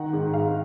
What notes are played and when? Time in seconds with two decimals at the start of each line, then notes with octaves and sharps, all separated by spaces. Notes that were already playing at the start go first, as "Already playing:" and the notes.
Already playing: D#3 F#5
0.13 G#2
0.34 G#2 F5